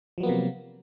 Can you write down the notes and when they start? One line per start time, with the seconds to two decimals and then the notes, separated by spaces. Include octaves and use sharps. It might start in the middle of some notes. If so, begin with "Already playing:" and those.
0.18 F3
0.20 F#3
0.23 B3
0.26 A#3
0.29 C3